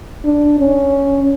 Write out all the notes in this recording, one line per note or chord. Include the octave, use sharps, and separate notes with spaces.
D4
C#4